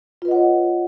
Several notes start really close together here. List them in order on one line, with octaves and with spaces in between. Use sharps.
F4 B4 D#5 F#5 C#5